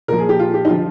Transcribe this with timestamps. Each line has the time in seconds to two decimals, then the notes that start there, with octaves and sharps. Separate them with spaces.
0.08 A#2 F3 A#4
0.19 G#4
0.29 G4
0.39 F4
0.54 G4
0.65 D#4
0.69 D3 F3 F4